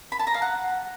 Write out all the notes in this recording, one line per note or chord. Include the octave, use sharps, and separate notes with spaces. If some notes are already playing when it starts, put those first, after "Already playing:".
B5
A5
A#5
F5
F#5